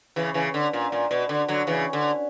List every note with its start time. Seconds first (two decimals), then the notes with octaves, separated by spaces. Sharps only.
0.16 C#3 E3
0.34 C#3 E3
0.54 D3
0.73 A#2
0.92 A#2
1.11 B2
1.29 D3
1.48 D3 F#3
1.67 C#3 E3
1.93 D3